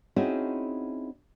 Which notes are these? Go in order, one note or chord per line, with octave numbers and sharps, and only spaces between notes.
C4 C#4 D#4 E4 F#4 G#4